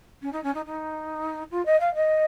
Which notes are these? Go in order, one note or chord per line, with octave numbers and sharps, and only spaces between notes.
C#4
D#4
C#4
D#4
D#4
F4
D#5
F5
D#5